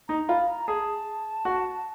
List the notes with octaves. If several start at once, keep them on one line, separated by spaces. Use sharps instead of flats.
D#4 A#5
F4 B5
A#5
G#4 A5
F#4